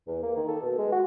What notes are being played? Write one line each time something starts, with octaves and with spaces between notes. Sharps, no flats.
E2
A#3
D#3
A4
B2
G#3
F#4